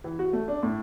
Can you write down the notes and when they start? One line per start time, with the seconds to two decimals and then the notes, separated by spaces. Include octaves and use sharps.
0.04 E3
0.19 F#4
0.33 A3
0.48 D4
0.63 A2